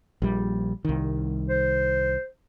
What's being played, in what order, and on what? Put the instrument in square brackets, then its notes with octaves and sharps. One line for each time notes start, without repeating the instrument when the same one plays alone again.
[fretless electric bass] A#1 G3
C2 D#3
[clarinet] C5